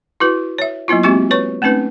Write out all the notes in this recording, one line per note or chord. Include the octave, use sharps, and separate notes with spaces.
E4 F#4 B4
C#5 E5
F#3 A#3 B3 E4 F4
G#3 A#3 C4 F#4 G4 C#6
B4 C#5 C#6
A3 C4 C#4 D#4 B4